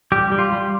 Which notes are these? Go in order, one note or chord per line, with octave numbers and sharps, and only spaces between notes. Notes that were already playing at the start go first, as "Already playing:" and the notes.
G3 G4
G3
F4
G3